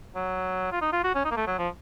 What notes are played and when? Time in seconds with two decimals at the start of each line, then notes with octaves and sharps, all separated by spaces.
0.16 F#3
0.72 F4
0.82 D#4
0.93 F4
1.04 F#4
1.15 C#4
1.25 D#4
1.31 A#3
1.37 A3
1.47 F#3
1.59 F3